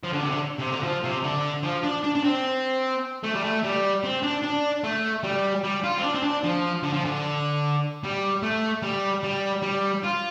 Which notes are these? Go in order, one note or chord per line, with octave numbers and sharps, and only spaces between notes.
F3
D3
C3
D3
C3
D3
F3
C3
D3
F3
D4
D4
D4
C4
A3
G3
A3
G3
C4
D4
D4
A3
G3
G3
F4
C4
D4
C4
D4
F3
D3
F3
D3
G3
A3
G3
G3
G3
F4